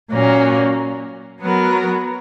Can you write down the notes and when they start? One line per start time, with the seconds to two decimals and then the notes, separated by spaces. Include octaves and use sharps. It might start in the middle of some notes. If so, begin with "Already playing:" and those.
0.11 A#2 F#3 A#3 C#4
1.41 F#3 B3 F#4 A#4